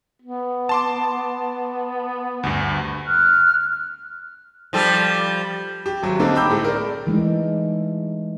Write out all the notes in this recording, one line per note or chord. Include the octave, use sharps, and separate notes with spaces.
B3
A5 C6 D6
D2 G2
F6 F#6
F3 G3 A4
G4
G#1 F#3
D3 A3 A#3 C4 D#4
G5 A#5 B5 D6 E6 G6
A2 G#3 A3
A#4 D5
E3 G#3 A3 D#4